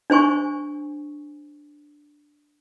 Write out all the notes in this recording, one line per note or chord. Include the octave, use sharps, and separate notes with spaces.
D4 C5 G#5 C#6